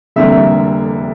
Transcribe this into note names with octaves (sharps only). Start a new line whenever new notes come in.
F1 F2 D3 G3 A#3 E5